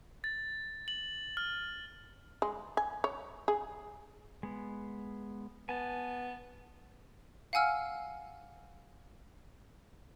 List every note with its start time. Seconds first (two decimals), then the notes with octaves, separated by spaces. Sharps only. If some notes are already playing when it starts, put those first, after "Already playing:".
0.24 A6
0.88 F#7
1.37 F6
2.42 G#3
2.77 G#5
3.04 C#5
3.48 G#4
4.43 G#3 B3
5.69 B3 G#5 A5
7.53 F5 F#5 G#5 E6 F6